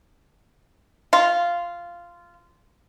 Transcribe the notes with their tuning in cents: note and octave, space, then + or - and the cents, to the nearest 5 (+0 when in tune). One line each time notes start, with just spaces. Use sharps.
F4 -10